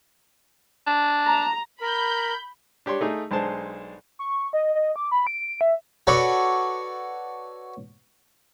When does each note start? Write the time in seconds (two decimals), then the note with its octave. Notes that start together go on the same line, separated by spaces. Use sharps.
0.87 D4
1.27 A#5
1.81 A#4 B5 G6
2.86 D4 G4 C#5 C6
3.01 A3 D#4 G#4
3.31 B1 G#3 D4 C5 A5
4.19 C#6
4.53 D#5
4.75 D#5
4.96 D6
5.11 B5
5.27 D7
5.61 E5
6.07 F#4 A4 B4 C#5 D5